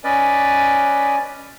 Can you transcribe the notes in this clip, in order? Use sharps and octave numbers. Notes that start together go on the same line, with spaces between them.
C#4 B4 D5 D#5